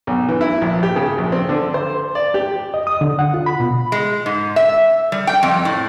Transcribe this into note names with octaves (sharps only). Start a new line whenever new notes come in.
B1
E3
E4
A#1
G4
C#3
A#1
C4
D3
C5
D5
G4
D#5
D#6
D3
F#5
F4
B5
B2
G#3
G#2
E5
G3
G5
F2
A2